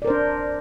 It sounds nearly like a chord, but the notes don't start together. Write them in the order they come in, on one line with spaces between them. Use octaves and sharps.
D5 A#4 C5 D4